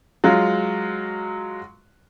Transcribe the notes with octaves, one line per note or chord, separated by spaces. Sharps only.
F#3 G#3 F4